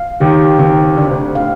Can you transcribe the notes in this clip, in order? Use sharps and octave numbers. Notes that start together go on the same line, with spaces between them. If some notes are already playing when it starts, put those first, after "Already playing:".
Already playing: F5
D#2 D#3 G4
D#2 D#3 C4
D3 D5
C3
D2 D3
A2 F5